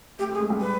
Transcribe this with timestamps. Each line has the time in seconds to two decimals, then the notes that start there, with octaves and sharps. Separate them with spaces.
0.19 A3 G4
0.29 A3
0.33 G#4
0.40 G#3
0.50 G3
0.61 B4